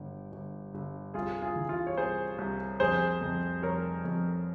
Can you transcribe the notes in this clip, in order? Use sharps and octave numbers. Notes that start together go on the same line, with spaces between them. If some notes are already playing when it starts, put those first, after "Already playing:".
Already playing: G1
G1
G1
C2 F4 G#4
F4 G#4
E3
F4 G#4
C#5
C2 G#4 C5
C2
F2 G#4 C5
F2
F1 A#4 C#5
F2